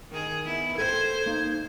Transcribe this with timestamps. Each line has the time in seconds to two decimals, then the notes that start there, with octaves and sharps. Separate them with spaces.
0.10 D#3 G#4
0.45 B3 E4
0.78 A4 C5 G5 G#6
1.26 A#3 D#4